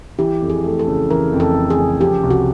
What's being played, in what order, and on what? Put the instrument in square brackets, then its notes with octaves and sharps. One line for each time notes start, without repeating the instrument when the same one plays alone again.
[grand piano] E3 [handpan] G4
[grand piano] F2
[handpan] G#4
[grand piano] A3
[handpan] A4
[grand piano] C#3
[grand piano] E3 [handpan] A#4
[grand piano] F2
[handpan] A4
[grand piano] A3
[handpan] G#4
[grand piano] C#3
[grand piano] F3 [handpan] G4
[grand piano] C2
[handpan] F#4